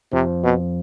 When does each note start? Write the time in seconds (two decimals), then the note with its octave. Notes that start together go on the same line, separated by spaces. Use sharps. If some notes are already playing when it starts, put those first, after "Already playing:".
0.13 F2 C3 F3
0.44 B2